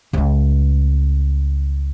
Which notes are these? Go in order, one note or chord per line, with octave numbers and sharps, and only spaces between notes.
C#2 A3